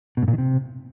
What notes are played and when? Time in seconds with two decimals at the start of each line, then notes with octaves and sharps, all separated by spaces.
0.17 B2
0.23 G#2
0.28 A#2
0.33 D#3
0.38 C3